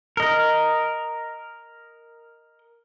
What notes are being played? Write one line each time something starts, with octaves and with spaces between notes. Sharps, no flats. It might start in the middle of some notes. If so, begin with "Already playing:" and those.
A#4 D#5